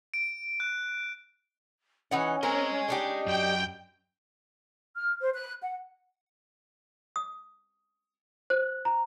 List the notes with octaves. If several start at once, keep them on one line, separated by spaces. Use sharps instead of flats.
D7
F#6
E3 C#4 D#4 F#5
C4 A#4 D#5 G#5
D4 D#4 G4
F#2 G5
F6
C5
F#6
F#5
D#6
C5 F#6
A#5